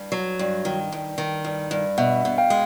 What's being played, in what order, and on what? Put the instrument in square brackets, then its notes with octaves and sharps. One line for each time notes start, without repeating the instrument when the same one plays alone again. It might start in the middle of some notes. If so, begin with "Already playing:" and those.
Already playing: [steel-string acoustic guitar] G2
F#3
G2
D#3
G2
D#3
G2
G2
[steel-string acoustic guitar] B2 [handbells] E5 F#5
[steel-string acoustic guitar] B2
[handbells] F5 G5
[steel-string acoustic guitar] G#3